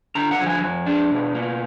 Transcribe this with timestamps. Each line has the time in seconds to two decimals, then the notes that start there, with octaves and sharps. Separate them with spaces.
0.15 D3 A#5
0.31 F#5
0.39 F3
0.46 G#5
0.62 F2
0.86 D4
1.11 B2
1.34 A#3